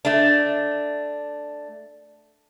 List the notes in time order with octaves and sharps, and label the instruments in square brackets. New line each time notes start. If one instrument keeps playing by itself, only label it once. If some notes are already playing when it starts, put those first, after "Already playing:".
[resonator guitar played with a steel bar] A3 D4